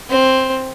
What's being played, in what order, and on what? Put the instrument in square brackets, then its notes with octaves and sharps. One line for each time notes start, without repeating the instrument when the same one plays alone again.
[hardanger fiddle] C4